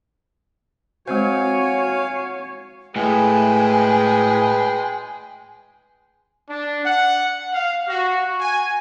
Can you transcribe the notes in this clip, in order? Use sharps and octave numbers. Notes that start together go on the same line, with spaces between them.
G#3 C4 F#4 C5 C#5 F5 G#5
A2 G#3 B4 G5 G#5
D4
F#5
F5
F#4
G#5